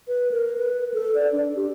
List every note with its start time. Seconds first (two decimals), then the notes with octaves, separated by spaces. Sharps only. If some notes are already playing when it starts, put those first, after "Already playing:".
0.08 B4
0.31 A#4
0.57 B4
0.94 A4
1.15 D5
1.32 D4
1.56 G4